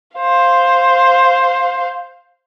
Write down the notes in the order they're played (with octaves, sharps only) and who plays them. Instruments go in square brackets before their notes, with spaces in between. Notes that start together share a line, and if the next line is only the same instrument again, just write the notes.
[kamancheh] C5 F5